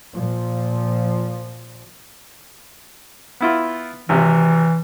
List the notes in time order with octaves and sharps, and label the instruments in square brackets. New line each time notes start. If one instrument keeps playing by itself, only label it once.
[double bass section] A#2 F3
[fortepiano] B3 E4 F4
[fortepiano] G#1 C3 [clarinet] E3